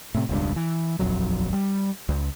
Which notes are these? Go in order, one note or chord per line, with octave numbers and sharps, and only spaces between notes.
A2 C3
E1 C#2 G2
E3
D#1 A#1 F2 F#3
G3
C#2